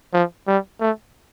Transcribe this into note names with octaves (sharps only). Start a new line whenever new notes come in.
F3
G3
A3